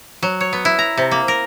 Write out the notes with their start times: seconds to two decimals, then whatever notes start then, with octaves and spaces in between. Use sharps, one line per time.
0.23 F#3
0.41 C#5
0.53 B3
0.65 E4
0.79 A#5
0.97 C3
1.11 A#3
1.28 A#4